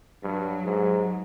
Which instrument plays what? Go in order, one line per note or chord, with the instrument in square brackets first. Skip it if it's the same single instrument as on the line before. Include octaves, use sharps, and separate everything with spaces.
[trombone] G2 [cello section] F#3
[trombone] G#2